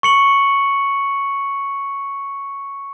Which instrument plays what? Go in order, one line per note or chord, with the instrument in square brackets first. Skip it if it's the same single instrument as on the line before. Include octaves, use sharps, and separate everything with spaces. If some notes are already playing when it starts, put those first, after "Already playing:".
[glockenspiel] C#6 C#7 F#7